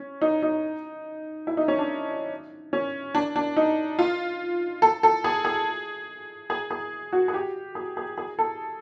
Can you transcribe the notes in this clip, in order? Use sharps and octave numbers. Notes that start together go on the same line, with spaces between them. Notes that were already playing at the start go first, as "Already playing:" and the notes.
Already playing: C#4
D#4
D#4
E4
D#4
C#4
D4
C#4
D4
D4
D#4
F4
A4
A4
G#4
G#4
G#4
G#4
F#4
G#4
G4
G#4
G#4
G#4
A4